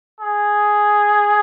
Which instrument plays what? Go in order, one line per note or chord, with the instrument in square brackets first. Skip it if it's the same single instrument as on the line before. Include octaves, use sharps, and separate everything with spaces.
[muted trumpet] G#4